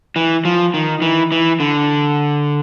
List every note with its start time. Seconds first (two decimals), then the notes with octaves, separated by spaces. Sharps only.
0.16 E3
0.45 F3
0.74 D#3
1.02 E3
1.32 E3
1.60 D3